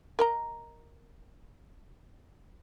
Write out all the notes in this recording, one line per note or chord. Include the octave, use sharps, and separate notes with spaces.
A#4 D#5 A#5